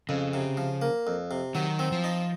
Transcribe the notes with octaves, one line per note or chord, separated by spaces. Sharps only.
F2 C#3
C3
F3
A#3
F2
C3
D#3 F#3
C4
F3
D#4